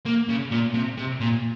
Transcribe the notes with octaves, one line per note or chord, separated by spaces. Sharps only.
A#3
C#3
A#2
C3
C3
A#2